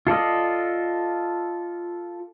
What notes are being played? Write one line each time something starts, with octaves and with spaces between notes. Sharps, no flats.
F4 A4 D5 D#5